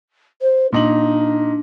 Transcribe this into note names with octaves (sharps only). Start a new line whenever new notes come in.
C5
A#2 D4 D#4 F#7